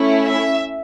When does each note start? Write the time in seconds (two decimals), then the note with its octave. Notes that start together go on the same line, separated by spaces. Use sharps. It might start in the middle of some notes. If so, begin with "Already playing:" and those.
Already playing: A3 C#4 E4
0.24 E5